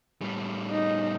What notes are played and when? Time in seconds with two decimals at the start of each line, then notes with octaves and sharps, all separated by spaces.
0.22 A2 G3
0.70 D#4